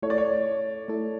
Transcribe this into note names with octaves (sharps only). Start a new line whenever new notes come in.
A3 E4 A4 C#5
D5
C#5
A3 E4 A4